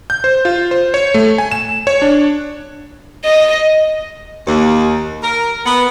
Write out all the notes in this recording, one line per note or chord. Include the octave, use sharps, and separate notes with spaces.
G6
C5
F4
C5
C#5
A3
G#5
E7
C#5
D4
D#5
D#2
A#4
B3